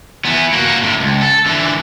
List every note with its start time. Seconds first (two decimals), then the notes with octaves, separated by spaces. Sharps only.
0.25 E3 B3
0.52 A#3 F#4
0.82 A2 D3
1.00 C#2
1.21 A4
1.46 D3 E3